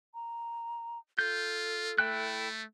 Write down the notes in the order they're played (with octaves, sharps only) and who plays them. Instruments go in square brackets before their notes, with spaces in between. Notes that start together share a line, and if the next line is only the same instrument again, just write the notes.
[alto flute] A#5
[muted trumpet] F4 [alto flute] A4 [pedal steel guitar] G6
[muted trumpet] A3 [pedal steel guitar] E4 G5 F#6